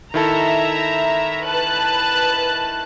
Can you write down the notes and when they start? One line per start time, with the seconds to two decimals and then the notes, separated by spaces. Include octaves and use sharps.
0.14 D#3 E4 A4 E5 A#5
1.46 B4 A5 F#6